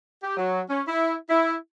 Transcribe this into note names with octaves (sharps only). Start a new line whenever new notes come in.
G4
F#3
C#4
E4
E4